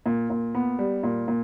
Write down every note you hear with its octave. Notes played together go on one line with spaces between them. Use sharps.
A#2
A#2
B3
G3
A#2
A#2